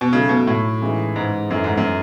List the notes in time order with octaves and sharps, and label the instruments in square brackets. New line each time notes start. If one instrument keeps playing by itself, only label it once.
[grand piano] B2
[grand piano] C#3 [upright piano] F#3 A3 D#4
[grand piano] B2
A2
[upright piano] C#3 E3 G#3 D#4
[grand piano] G#2
[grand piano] F#2 [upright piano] E3 A3 D#4
[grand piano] G#2
F#2